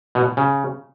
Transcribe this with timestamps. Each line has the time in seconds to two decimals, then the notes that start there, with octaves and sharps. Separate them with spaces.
0.15 B2
0.37 C#3